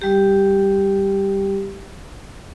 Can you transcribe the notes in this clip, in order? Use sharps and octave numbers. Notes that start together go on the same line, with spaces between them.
G3 G4